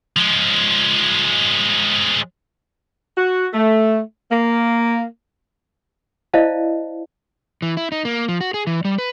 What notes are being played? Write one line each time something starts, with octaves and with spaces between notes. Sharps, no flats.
F3 G#3
F#4
A3
A#3
E4 C5 D5 D#5 F5 A5
E3
E4
D#4
A#3
F3
F#4
G#4
E3
G3
B4